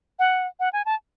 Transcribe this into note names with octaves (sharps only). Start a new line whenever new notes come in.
F#5
F#5
G#5
A5